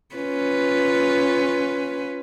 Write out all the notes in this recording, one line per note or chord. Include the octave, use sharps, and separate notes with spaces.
C#4 F4 B4